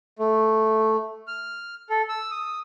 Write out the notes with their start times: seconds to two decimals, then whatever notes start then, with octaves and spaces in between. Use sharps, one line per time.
0.19 A3
1.27 F6
1.90 A4
2.09 E6
2.31 D#6